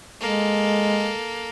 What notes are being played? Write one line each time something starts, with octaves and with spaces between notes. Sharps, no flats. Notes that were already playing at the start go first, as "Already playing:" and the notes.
G#3 A#3 A4